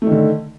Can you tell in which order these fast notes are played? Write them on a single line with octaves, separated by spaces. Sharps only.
A3 D#3 D3